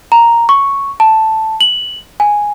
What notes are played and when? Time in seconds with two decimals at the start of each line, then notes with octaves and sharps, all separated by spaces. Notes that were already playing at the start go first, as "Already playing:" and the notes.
0.12 A#5
0.49 C#6
1.00 A5
1.61 F#7
2.20 G#5